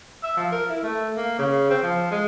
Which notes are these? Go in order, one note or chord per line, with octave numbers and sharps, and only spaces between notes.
E5
F3
A#4
E4
A3
A#3
C#3
C4
F3
G#3